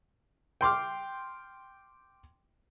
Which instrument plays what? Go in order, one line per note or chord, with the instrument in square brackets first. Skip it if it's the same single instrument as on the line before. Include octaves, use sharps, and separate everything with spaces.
[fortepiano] G5 C6 D6 F6